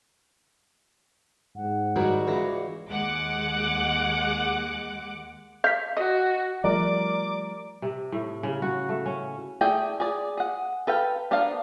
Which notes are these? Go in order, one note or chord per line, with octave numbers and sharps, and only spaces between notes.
G#2 F#5
D#3 G3 F#4 C#5 D5
C#2 E3 A#5
D#2 G#3 F#5 D6
F5 G6 B6
F#4 D#5
F3 G3 A3 A#4 D5 D6
C3
A2
C#3
F#4
A3
C#4
A3 E4 G#4 D5 G5
G#4 D5
G#4 F#5
A4 B4 F5 G5
B3 D4 A#4 C5 F5